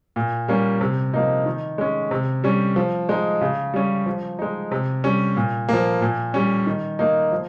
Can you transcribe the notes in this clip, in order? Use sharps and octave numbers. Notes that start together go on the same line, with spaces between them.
A#2
G3 A#3 C#4
C3
F3 A#3 D#4
D#3
G#3 C#4
C3
G3 C#4
F3
G#3 D#4
C#3
G3 C#4
F3
G#3 D#4
C3
G3 C#4
A#2
F3 A#3
A#2
G3 C#4
D#3
A#3 D#4
F3